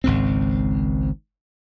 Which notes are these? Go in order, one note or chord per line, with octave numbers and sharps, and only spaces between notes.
G#1 C#2 G#2 C4